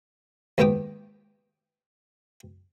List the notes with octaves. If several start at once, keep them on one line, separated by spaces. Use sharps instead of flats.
D#2 G#2 B3 G4 G5 D#6